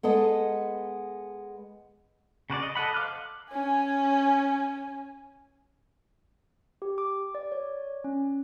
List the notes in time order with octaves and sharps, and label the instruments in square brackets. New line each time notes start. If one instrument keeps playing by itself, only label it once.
[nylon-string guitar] G#3 B3 A4 D#5
[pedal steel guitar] C#3 F#4 B4 D5
D#5
A4 D#5 F#5 B5
C5 F5 D6 F6 F#6
[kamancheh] C#4 G#5
[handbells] G4
D6
D5
C#5
C#4